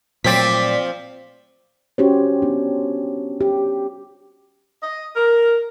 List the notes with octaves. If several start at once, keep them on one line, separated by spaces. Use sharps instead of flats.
A#2 F3 F#3 A3 C4 D5 B6
C#4 F#4 G4 C5 C#5
B3 D4
G4
D#5
A#4